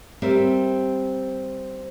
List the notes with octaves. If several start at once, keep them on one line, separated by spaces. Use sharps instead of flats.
G3 C4 A#4 E5